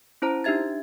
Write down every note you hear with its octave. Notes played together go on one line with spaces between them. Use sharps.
C#4 E4 C5 A#5
D4 D#4 G4 E5 G#6 A6